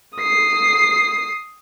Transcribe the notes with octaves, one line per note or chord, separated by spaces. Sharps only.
D#6 C7